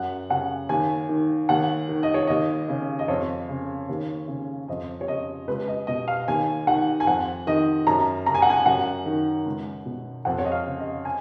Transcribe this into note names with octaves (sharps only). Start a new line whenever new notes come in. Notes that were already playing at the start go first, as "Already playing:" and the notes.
Already playing: F#2 F#5
C#3 F#5
D#2 G#5
D#3
D#2 F#5
D#3
D#5
C#5
D#2 D#5
C#3
D#5
F2 C#5
C#3
D#2
C#3
F2 D#5
C#5
C#3 D#5
C#2 B4
D#5
B2 D#5
F5
D#2 G#5
D#3 F#5
G#5
F2 F#5
D#3 D#5
F#2 A#5
C#3 A#5
G#5
F#5
G#5
F#2 F#5
D#3
C#2
B2
F2 F#5
C#5
D#5
F5
C#3
D#5
G#5